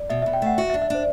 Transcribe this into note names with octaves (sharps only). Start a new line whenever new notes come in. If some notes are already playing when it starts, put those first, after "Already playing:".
Already playing: D5
B2 E5
B2 E5
G5
A3 F#5
F#4 E5
E5
D4
E5
D4 C5